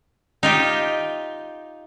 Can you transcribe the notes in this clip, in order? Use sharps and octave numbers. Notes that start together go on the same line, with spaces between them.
D#4 F4 G4